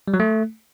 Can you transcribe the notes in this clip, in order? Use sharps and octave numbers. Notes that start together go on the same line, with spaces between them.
G3
F#3
A3